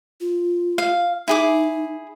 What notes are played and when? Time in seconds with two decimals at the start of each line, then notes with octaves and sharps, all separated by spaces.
0.21 F4
0.78 F5
1.28 D#4 E4 G#4 D6